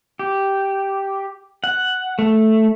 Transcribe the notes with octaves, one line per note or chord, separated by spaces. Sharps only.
G4
F#5
A3